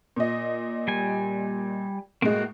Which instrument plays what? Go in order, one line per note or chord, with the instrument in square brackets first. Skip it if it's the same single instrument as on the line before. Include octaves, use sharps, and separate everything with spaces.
[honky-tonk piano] A#2 D#5
[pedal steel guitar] G3 G#5
[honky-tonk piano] A2 G#3 [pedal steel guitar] A#3 F#4